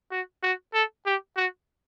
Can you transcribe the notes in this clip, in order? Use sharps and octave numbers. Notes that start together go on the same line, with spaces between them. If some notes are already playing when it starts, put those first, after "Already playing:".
F#4
F#4
A4
G4
F#4